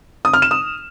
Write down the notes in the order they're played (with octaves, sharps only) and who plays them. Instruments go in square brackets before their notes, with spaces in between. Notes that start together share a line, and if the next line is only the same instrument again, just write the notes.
[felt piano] D#6
F6
E7
D#6